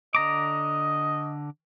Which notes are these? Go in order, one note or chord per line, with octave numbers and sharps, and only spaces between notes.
D3 D#5 A#5 D6